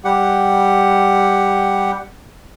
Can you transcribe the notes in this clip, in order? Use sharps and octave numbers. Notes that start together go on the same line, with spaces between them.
G3 G4 F#5